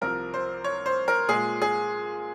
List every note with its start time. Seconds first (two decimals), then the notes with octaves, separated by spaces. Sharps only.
0.01 C2 C3 F3 A#4
0.34 C5
0.64 C#5
0.86 C5
1.08 A#4
1.28 A#2 G#3 G#4
1.62 G#4